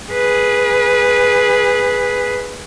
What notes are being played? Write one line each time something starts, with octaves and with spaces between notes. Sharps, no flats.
G#4 B4